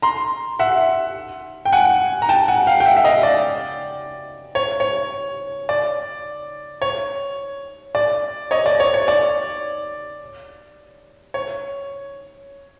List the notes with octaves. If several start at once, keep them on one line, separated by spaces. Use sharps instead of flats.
A#5 C6
E5 F#5
G5
F#5 G#5
A#5
G5 A5
F#5 G#5
F5 G5
G5
E5 F#5
E5
D#5 F5
D5
C#5
C#5
D5
C#5
D5
C#5 D#5
D5
C#5
C#5
D5
C#5